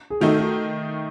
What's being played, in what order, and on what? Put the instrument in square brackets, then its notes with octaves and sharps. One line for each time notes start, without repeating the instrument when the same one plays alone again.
[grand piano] G#4
[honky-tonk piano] D#3 A3 D#4 [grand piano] F#4 A4
[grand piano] F#4 A4